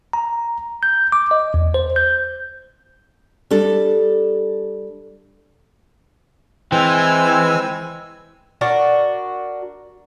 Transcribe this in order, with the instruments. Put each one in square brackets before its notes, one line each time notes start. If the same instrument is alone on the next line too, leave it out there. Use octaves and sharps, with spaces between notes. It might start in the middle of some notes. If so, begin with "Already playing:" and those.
[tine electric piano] A#5
G6
D6
D#5
E2
C5
G6
[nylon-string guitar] G3 D4 A4
[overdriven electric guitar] E3 [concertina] G#3 G#5 E6 [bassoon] C4
[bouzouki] D4 F#4 A#4